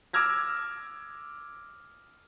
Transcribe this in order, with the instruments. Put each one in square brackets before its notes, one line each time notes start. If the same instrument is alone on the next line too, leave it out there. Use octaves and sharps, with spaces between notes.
[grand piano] D6 E6 F6 G#6 A#6